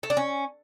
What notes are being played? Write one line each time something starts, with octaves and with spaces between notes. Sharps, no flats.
A3
D4
C#4